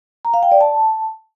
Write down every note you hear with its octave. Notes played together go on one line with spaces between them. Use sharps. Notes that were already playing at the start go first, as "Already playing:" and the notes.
A#5
F5
G5
D5
A5